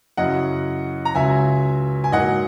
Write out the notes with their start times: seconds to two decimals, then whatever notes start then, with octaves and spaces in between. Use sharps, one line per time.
0.17 F#2 C#3 F#3 C#4 E4 D#5 F#5
1.05 A#5
1.15 C#2 C#3 F#3 E5 G#5
2.04 G#5
2.12 G#2 F#3 A#3 D#4 D#5 F#5